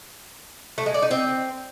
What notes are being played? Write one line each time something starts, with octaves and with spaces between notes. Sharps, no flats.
A3
G#3
D5
D#4
C4